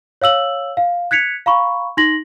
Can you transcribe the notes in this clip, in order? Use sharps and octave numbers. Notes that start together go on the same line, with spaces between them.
C#5 F5 E6 F#7
F5
F#6 G#6 B6 C#7 F7
F5 A#5 B5 C#6
D#4 C6 A#6 F#7